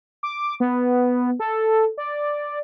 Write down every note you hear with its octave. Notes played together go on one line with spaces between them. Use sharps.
D6
B3
A4
D5